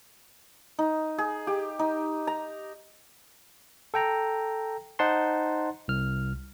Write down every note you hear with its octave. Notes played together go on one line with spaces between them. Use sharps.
D#4
G#4
G4
D#4
A#5
A4 G5 A#5
D#4 C5 F#5 A5 C6
C2 F6